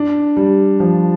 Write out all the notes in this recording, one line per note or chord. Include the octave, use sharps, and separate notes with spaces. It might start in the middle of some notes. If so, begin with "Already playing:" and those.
Already playing: D4
G3
F3